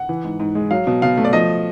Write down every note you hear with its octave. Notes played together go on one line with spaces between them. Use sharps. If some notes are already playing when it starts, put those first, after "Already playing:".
Already playing: F#5
E3
G#2
G#2
G#3
F#3 F5
B2
B2 F5
A3
D5
F3 D#5